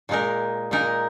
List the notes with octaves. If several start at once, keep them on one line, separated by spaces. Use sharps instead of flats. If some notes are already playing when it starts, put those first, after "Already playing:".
A#2 G#3 D#4 A#4
A#2 G#3 D#4 A#4